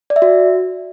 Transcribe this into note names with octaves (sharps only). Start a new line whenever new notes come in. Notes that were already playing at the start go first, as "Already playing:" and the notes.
D5
E5
F#4